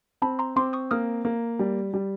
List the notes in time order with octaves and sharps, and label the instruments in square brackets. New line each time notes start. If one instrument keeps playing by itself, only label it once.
[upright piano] C4 [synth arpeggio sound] A5 B5
[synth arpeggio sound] A#5 C6
[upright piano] C4 [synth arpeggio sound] C6 D6
[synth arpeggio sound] C#6 D#6
[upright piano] A#3 [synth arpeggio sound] D#6 F6
[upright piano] A#3
G3
G3